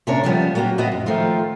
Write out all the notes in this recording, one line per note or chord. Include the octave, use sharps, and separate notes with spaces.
C3 A#3 C#4 D4 A#4 C#5
C#3 F3 G3 A3 B3 C#4
F#3 A#3 B3 F#4 G4
A2 B3 F#4 D#5
F#2
D#3 F3 A3 F4